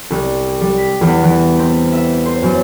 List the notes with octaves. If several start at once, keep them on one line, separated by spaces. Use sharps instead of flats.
C2
G3
B6
E2
E3
C4
E5
C5
F#2